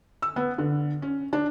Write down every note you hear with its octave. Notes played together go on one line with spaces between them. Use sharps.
E6
B3
D3
C#4
D4